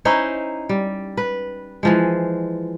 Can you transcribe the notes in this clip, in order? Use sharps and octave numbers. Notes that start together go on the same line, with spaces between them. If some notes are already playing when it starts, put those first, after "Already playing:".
C#4 D#4 E4 C5
G3
B4
E3 F3 G#3